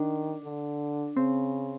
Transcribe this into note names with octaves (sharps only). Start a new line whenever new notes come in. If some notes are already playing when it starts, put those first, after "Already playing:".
Already playing: D#3 D4
D3
C#3 C4